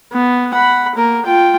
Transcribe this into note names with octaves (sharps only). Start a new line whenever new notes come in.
B3
F#5 B5
A#3 A#4
F4 G5